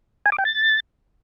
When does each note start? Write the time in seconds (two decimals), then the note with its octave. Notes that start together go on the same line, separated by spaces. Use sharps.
0.26 G#5
0.32 D6
0.38 G5
0.45 A6